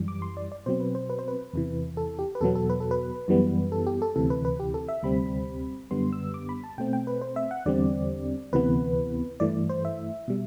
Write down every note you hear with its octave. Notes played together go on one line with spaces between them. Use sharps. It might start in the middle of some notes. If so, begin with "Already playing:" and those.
Already playing: F#2 E3 G3
D6
C6
D5
D5
B2 F#3 C4 C5
B4
C5
B4
C5
B4
E2 C3 E3
A4
G4
B4
E2 B2 F#3 B3 A4
A4
B4
A4
B4
F#2 E3 G3 B3
A4
G4
A4
D2 C3 E3 A4
B4
B4
G4
A4
E5
D2 C3 G3 C4 B5
F#2 D3 G3 B3 C6
E6
D6
B5
A5
B2 A3 C4 G5
G5
B4
C5
E5
F#5
E2 D3 G3 C4 D5
D2 C3 E3 B3 B4
G2 E3 A3 D5
C5
E5
B2 G3